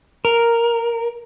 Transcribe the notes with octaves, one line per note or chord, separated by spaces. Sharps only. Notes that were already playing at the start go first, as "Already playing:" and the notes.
A#4